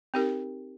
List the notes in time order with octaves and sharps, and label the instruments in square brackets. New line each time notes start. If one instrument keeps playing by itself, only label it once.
[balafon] C4 D#4 G4 A#4